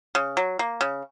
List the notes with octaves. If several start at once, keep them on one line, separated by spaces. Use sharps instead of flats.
C#3
F#3
A#3
C#3